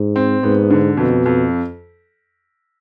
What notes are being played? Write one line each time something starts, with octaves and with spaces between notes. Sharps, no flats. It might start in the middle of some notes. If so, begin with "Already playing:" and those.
Already playing: G#2
C4
G#2 B3
D3
F2 B2
F2